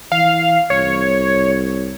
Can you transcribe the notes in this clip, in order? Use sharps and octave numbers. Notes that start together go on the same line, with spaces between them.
E3 F5
C2 C#5